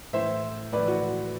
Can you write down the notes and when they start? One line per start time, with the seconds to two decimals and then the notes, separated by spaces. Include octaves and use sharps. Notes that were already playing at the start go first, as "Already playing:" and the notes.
0.13 A2 E3 C5 E5
0.72 A2 E3 B4 D5
0.87 F#4